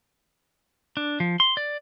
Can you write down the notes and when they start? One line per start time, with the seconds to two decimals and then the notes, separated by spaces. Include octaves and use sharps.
0.97 D4
1.20 F3
1.40 C6
1.57 D5